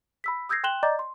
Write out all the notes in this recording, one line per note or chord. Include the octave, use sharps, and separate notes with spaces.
B5 E6 B6
D#6 E6 G6 G#6 A#6 C7
G5 C6 F#6 E7 F#7 G7
D5 D#5 A#5 D6 G6 A6
C6